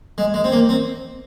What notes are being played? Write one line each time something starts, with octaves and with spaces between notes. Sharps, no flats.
G#3
G#3
C4
A#3
C4